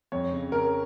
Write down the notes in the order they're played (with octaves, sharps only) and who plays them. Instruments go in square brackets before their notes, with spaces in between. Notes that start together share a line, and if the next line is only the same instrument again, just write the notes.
[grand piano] F2 C#5
C#3
C#3 A#4